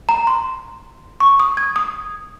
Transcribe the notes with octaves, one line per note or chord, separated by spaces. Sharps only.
A#5
C6
C#6
D#6
G#6
D#6